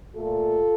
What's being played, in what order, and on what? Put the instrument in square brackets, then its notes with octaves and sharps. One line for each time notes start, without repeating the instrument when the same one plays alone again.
[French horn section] A#2 A3 F4 A4